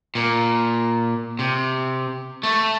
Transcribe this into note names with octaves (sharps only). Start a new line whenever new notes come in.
A#2
C3
A3